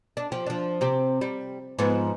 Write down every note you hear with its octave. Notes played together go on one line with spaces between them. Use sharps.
D4
F3 G4
F3 D4
C3 C4 G4
G3
G#2 F3 B3